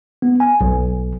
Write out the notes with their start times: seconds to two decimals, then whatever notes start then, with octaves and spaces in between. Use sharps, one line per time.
0.22 B3
0.40 G#5
0.61 B1